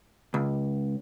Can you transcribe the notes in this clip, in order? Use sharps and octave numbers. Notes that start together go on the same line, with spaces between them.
C#2